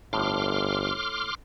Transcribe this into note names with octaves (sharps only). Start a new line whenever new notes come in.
G1 A2 C6 D6 F6